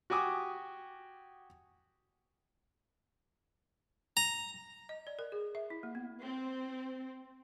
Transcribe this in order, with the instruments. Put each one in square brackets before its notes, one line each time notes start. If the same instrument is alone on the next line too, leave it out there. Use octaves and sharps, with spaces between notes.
[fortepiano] F#4 G4 G#5 D6 D#6
[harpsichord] A#5
[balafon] D#5
D5
A#4
G#4
E5
E4
A#3
B3
[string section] C4